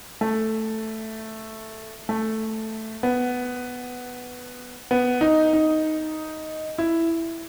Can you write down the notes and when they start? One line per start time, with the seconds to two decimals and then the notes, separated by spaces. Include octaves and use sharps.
0.21 A3
2.09 A3
3.03 B3
4.91 B3
5.21 D#4
5.53 D#4
6.78 E4